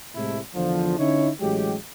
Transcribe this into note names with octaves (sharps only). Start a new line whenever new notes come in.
A2 C3 G#3 A3 E4
E2 D3 F3
D3 C#4 D#4 E4 C#5
A1 F#3 G#3 G4